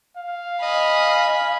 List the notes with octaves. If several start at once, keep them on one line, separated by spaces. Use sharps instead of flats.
F5
D#5 G#5 B5